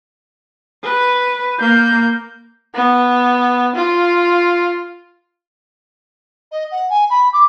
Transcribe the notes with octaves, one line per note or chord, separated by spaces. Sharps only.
B4
A#3 G6
B3
F4
D#5
F#5
G#5
B5
D6